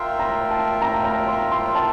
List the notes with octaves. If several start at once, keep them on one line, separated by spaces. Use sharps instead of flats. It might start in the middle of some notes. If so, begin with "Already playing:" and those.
Already playing: F4 A#4 E5 G5 C6
A#5
A5
A#5
A#5
C6
C6
A5